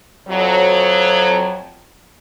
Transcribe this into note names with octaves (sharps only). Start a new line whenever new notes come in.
F2 F#3